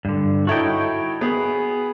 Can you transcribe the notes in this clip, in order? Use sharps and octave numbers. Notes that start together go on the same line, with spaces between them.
G2 D3
D#4 E4 F#4 A4 C#5 G5
B3 G#4